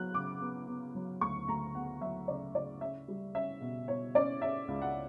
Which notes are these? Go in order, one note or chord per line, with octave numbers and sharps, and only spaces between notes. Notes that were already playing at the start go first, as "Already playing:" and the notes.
Already playing: F#3 B3 F#6
C#3 D6
B3
B3
F#3
D2 C#6
D2 A#5
B3 F#5
F#3 E5
C#3 D5
C#3 D5
C#4 E5
G3
C#4 E5
B2
B2 C#5
C#4 D5
C#4 E5
C#2
F#5